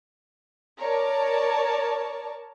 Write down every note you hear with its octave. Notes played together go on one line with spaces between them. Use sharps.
A#4 C#5 D5 A5